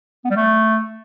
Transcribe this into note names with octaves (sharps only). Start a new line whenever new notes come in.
B3
G3
A3